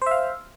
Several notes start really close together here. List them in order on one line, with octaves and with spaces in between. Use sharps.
C5 E5 F5